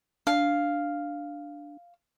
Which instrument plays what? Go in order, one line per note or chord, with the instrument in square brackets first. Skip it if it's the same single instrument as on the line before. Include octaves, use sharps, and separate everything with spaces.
[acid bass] D4 [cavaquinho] F5